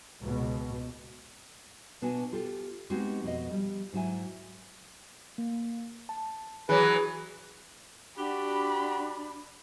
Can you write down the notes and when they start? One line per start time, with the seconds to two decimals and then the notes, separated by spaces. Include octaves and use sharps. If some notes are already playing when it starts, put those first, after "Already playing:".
0.22 C#2 B2
2.02 B2 B3 D4 F#4 G#5
2.32 F4 G4 A4
2.90 G#3 B3 C4 D#4 F#4 G4
3.23 F2 B2 D#5
3.51 F3 G3
3.93 G#2 F#3 E4 G#5
5.38 A#3
6.09 A5
6.69 E3 F#3 G#4 B4
8.17 D4 F#4 G4 B5